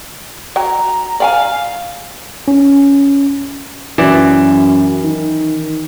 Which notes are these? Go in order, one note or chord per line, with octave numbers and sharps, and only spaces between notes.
F#3 G5 A#5
D5 F5 G5 G#5
C#4
F#2 E3 D5
D#3